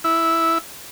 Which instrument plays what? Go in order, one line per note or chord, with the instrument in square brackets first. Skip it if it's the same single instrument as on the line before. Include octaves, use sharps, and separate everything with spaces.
[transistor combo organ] E4